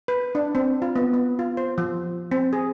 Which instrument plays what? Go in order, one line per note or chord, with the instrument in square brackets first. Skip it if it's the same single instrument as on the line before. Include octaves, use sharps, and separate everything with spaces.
[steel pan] B4
D4
C4
F4
B3
B3
F4
C5
F3
C4
G#4